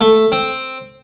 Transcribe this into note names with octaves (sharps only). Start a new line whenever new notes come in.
A3
C4